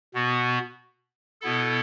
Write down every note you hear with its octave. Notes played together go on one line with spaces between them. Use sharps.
B2 B3 F#4
B2 B3 E4 A4